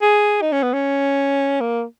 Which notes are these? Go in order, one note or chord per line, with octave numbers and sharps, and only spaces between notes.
G#4
D#4
C#4
B3
C#4
A#3